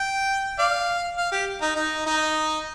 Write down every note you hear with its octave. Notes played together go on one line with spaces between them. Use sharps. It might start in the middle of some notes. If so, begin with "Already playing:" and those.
Already playing: G5
D5 F5
F5
G4
D#4
D#4
D#4